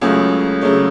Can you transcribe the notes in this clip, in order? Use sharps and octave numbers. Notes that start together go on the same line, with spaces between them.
C#2 C#3 F#3 A3 G#4
C#3 F#3 A3